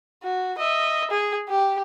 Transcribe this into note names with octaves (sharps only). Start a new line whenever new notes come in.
F#4
D#5 E5
G#4
G4